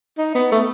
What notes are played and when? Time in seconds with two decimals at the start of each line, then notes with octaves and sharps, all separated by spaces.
0.18 D#4
0.35 B3
0.52 A3